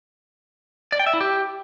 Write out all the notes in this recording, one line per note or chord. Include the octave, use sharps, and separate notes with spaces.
D5
G5
E5
E4
G4